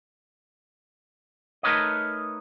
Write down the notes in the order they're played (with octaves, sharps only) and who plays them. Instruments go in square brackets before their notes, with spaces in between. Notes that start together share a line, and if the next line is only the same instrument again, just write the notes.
[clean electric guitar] A3 D#4 A#4 B4 C#5 D#5